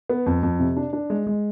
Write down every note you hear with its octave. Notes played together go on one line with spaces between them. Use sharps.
B3
F2
F2
C3
D4
D4
G#3
G#3